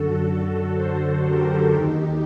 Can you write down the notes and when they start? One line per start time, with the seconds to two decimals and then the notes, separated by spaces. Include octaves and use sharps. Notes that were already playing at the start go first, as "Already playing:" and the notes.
Already playing: F#2 D3 F#4 A4
0.24 F#4 A4
0.73 A4 C5
1.22 G4 A#4
1.71 D#2 D#3 D#4 G4